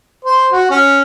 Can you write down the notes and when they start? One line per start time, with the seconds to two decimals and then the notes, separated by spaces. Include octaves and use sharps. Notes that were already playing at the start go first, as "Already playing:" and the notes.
0.25 C5
0.52 F#4
0.70 C#4